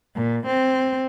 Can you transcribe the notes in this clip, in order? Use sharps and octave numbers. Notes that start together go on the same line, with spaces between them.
A#2
C4